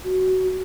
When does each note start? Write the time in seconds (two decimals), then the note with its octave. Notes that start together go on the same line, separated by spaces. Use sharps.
0.04 F#4